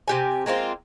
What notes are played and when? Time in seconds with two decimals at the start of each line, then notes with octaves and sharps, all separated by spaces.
0.08 C3 G4 G#5
0.46 G#3 A#3 C4 F4